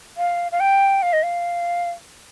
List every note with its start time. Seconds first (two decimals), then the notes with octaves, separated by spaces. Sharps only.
0.17 F5
0.52 F5
0.60 G5
1.02 F5
1.13 D#5
1.23 F5